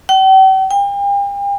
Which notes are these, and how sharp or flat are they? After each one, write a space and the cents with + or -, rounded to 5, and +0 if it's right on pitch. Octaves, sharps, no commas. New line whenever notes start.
G5 -45
G5 +40